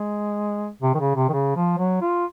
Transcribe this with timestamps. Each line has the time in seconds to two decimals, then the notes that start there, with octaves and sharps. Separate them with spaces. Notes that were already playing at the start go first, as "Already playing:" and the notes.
Already playing: G#3
0.82 C3
0.95 D#3
0.99 C#3
1.16 C3
1.29 D#3
1.33 C#3
1.56 F3
1.79 F#3
2.01 F4